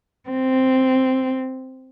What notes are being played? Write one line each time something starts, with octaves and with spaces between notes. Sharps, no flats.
C4